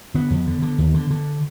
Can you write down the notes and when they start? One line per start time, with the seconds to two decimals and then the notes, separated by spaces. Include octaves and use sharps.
0.14 D3 B3
0.30 F2
0.47 D3
0.62 D3
0.78 D#2
0.94 D3
1.11 D3